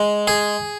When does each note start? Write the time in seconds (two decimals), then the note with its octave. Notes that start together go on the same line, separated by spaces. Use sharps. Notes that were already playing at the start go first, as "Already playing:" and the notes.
Already playing: G#3
0.27 G#4